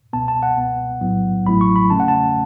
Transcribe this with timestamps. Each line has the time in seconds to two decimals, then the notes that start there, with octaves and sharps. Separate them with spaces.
0.13 C#2 B2 B3 A5
0.28 A5
0.43 F#5
0.57 C#2 B2 B3
1.01 B1 A2 F#3 B3 E4
1.45 A1 A2 F#3 A3 E4 B5
1.61 C#6
1.76 B5
1.90 E2 C#3 A3 C#4 A5
2.00 F#5
2.08 A5